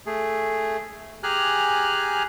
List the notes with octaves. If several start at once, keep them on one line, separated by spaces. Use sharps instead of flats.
A3 G#4
G4 G#4 G#5 A#5 F6 F#6